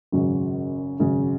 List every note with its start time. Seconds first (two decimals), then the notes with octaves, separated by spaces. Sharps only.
0.12 G#1 F#2 C#3 F#3
0.99 G#1 F#2 C#3 F#3